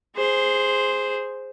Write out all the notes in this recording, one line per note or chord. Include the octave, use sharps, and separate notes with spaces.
G#4 C5